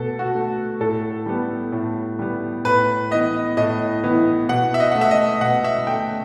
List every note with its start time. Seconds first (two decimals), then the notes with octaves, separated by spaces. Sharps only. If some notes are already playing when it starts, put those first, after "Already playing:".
Already playing: B2 A3 A4
0.19 F#4
0.35 A3
0.80 A2 A4
1.26 G3 B3
1.72 A2
2.19 G3 B3
2.65 A2 B4
3.11 E3 B3 D#5
3.57 A2 D#5
4.04 E3 B3
4.49 B2 F#5
4.74 E5
4.80 D#5
4.91 A3 F#5
5.01 E5
5.11 D#5
5.41 B2 F#5
5.64 E5
5.87 A3 G5